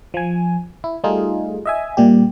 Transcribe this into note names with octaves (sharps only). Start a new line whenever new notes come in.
F3 G#5
E4
G3 A3 D#4 F4 G#4
D#5 E5 G#5
A#2 G3 G4